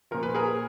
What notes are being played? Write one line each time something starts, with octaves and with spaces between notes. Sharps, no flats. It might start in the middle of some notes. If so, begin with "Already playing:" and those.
A#2 F3 A#4
B4
G#4 A#4